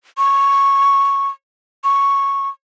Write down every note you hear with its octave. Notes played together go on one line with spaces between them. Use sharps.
C#6
C#6